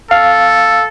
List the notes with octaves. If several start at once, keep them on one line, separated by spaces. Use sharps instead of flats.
A4 F5